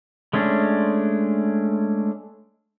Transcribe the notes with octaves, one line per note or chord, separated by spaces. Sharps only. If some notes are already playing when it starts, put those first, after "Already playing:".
G#3 A3 C#4 D4